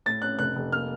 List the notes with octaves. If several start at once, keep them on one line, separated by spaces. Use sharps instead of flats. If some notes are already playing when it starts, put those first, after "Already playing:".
A2 A6
C#4 F#6
F1 F#6
F1
A#3 F6